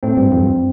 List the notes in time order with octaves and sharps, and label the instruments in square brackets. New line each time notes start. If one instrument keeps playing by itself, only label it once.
[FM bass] A2 [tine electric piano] C4
[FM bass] G2
F2
G2